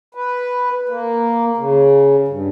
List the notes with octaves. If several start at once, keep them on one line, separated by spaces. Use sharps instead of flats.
B4
A#3
C#3
G2